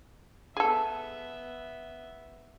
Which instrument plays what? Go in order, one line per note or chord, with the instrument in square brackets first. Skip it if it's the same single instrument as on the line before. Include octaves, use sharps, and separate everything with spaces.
[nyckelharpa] B3 E5 [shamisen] G#4 A4